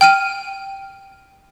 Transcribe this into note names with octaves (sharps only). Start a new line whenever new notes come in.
G5 F6 D#7